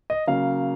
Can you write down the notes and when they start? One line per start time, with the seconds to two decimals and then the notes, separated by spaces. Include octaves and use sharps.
0.10 D#5
0.27 C#3 F#3 A#3 F5